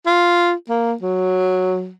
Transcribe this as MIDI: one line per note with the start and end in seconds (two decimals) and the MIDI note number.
0.07 0.52 65
0.69 0.94 58
1.03 1.91 54